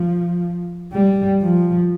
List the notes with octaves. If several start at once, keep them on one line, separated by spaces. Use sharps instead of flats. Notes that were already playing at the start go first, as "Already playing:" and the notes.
Already playing: F3
G3
F3